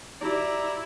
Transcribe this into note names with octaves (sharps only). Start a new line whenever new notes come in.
D#4 E4 F#4 G4 D5 A#5